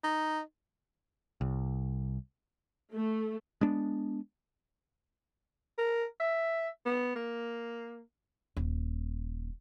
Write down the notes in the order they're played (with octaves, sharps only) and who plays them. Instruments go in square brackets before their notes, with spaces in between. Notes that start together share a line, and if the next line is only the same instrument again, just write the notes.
[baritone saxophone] D#4
[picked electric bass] C2
[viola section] A3
[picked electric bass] G#3 B3 D4
[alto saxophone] A#4
E5
B3
A#3
[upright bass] D#1